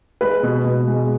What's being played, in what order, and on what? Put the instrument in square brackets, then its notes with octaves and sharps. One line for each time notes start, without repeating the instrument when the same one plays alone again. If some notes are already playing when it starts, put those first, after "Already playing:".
[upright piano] G#3 B4
B2
B2
G#3